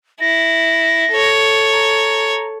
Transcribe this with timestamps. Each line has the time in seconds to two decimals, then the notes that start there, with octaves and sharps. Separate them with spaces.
0.21 E4 A#6
1.12 A4 C#5
1.72 A#5